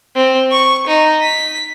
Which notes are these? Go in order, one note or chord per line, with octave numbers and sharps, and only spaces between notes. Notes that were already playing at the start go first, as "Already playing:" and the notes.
C4
C#6
D#4
B6